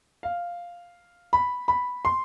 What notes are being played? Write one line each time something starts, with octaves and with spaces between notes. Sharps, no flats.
F5
B5
B5
C6